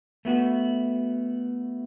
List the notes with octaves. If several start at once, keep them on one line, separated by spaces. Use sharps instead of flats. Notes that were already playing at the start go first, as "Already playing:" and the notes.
A3 B3 F#4